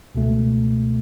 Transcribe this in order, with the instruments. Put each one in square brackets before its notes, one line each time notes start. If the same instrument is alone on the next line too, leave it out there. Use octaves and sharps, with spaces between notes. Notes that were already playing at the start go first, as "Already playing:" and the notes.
[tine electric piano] C#2 B2 A3